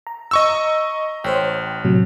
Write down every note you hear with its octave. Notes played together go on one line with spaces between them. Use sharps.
A#5
D#5 C#6 E6
A1 C5 C#5 G5
A2 C3 F#3